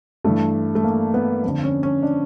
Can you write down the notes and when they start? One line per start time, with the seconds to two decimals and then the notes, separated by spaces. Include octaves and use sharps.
0.24 G2 E3 A3
0.75 A3
0.84 A#3
1.14 B3
1.43 F2 D3
1.64 C#4
1.83 C#4
2.03 D4